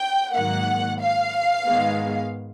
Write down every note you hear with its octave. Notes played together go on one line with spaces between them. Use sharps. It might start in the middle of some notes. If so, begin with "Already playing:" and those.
Already playing: G5
G#2 D#3 F#3 A#3 F#5
F5
G#2 D#3 G#3 B3